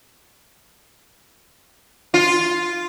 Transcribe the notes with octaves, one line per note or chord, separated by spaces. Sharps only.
F4